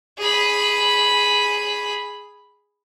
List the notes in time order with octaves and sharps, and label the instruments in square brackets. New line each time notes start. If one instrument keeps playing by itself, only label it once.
[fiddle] G#4 B5